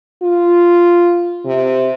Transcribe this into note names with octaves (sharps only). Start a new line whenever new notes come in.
F4
C3